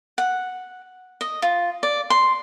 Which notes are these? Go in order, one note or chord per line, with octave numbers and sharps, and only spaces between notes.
F#5
D#5
F4
D5
C6